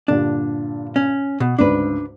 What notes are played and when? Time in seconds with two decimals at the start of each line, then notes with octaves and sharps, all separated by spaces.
0.08 G2 A#2 D3 D4
0.96 C#4
1.40 B2
1.59 D2 G#2 C#3 D4 B4